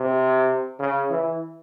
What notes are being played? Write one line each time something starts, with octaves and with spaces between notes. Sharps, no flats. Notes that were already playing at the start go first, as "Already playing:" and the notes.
Already playing: C3
C#3
E3